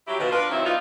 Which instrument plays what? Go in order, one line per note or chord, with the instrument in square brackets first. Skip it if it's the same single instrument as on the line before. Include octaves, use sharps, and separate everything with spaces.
[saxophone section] F#3 E4 G4
B2 D#3 F3 B3
D4 F4 A#4 B4
D#3 F3 F#3 C4 E4
B3 D4 D#4 F4